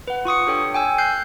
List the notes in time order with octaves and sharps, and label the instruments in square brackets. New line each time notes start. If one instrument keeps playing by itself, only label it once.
[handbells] B4 F#5
F4 C#6 D#6 C#7
D4 G4 A4 C#5 G5
G5 G#5 E6
F#6 G6 C7